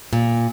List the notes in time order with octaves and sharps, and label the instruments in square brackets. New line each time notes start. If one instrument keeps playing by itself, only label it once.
[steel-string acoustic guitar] A#2